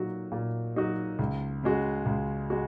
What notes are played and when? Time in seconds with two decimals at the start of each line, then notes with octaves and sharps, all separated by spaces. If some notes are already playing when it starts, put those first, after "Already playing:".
Already playing: A#2 F#3 D#4 F#4
0.32 A#2
0.76 F#3 D#4 F#4
1.19 C#2
1.63 C#3 G#3 F#4
2.06 C#2
2.50 G#3 F#4